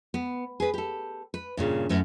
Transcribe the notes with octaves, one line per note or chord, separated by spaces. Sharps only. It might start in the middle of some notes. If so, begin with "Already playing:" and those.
B3
G#4 B4
G4 A4
B4
G2 A#2 C#3
F#2 A3 E4